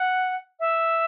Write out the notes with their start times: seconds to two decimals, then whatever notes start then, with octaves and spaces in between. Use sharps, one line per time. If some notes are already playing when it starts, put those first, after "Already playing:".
Already playing: F#5
0.59 E5